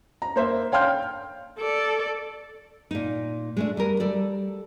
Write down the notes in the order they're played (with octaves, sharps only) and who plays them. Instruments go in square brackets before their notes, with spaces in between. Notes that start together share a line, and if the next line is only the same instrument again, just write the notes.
[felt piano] A#5
A#3 C5 E5
C#5 F5 G5 C6 F6 G6
[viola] A4 D5
[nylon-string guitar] A#2 D#4
G#3 A3 D4
G3 G#4 A#4
G3 A4 D5